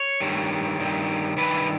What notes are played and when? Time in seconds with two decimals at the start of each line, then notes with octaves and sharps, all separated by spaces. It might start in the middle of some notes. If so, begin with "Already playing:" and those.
Already playing: C#5
0.21 G2 D#3
0.79 G2 D#3
1.37 G2 D#3 B4